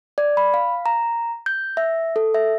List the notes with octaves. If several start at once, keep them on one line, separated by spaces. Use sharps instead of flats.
D5
B5
F5
A#5
G6
E5
A4
E5